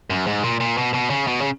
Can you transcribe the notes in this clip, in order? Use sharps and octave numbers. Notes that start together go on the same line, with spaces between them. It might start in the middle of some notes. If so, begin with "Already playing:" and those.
F#2
G#2
A#2
A#2
B2
B2
C#3
B2
C#3